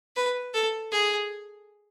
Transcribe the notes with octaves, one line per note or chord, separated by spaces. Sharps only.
B4
A4
G#4